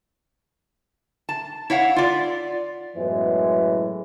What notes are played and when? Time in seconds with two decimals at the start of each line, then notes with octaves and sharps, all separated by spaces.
1.29 A5
1.70 E4 C#5 F5 F#5
1.96 F4 D5
2.96 F#2 A2 E3 G#3 B3